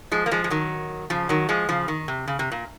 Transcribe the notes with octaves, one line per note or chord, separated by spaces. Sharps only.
F3 G#3
A#3
F3 G#3
G#3
D#3 F#3
C#3 F3
D#3 F#3
F3 G#3
C#3 F3
D#3
C3
C#3
C3
A#2